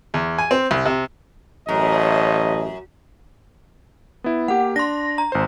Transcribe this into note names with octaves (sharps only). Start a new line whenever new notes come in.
E2
G#5
C4
C2
C3
A1 F#2 D#5
B3 E4
A#3 G4 F#5
D4 C6 A#6
A#5
G#1 C5